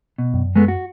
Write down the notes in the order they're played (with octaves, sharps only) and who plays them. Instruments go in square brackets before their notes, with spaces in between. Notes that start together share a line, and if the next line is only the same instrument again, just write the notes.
[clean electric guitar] B2
[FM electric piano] F#2
[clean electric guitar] G#3 A3 B3
F#4